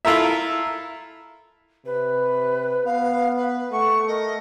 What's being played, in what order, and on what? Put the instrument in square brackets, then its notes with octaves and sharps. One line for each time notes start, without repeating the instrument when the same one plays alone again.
[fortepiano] E4 F4 A4 A#4 E5
[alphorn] C3 [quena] B4
[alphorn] B3 [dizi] F5
[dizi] B4
[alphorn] A3 [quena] F#5 [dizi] C#6
[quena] A#4 [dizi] D#5